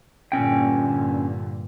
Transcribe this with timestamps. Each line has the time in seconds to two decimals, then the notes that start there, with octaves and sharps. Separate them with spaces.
0.32 G2 A#2 D3 C#4 G5